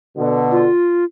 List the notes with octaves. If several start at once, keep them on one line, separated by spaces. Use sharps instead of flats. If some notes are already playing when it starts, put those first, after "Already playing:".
B2 D3
F4